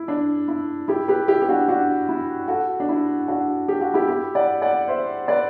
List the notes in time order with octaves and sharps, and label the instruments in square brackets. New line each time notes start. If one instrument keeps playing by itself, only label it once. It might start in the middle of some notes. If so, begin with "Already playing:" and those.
Already playing: [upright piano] E4
D4
E4
E4 G4
G4 B4
E4 G4
G4
D4 F#4
D4 F#4
E4
F#4 A4
D4
E4
D4 F#4
G4
F#4
E4 G4
E4 G4
D5 F#5
D5 F#5
C5 E5
B4 D5